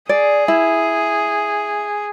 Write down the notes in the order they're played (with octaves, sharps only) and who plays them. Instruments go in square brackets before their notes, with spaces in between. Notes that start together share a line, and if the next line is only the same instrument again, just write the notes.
[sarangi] G#4 [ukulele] D5
[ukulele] E4